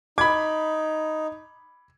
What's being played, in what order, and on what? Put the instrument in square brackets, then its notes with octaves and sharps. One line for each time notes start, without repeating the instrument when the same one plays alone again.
[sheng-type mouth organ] D#4 [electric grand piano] B5 D6 [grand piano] G#6